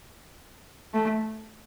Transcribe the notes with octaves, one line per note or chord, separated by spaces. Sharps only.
A3